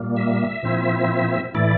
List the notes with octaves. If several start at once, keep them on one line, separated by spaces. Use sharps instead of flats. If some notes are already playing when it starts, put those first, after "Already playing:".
Already playing: A#2 G3 A#3
E5
A#2 F3 C4 E4
A2 E3 A3 E4 D5